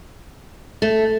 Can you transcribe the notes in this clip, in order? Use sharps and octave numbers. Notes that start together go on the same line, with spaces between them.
A3